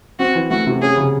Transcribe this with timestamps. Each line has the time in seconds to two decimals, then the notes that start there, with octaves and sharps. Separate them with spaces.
0.19 C4 F#4
0.35 E3
0.50 A3 F#4
0.66 C3
0.82 C#4 G#4
0.97 C#3